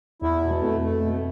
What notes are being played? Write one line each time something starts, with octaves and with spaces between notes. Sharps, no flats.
E2 E4
B2
F2 A3
A3
B2